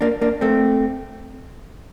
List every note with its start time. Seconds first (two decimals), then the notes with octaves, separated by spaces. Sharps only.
0.01 A#3 D4
0.21 A#3 D4
0.41 A3 C4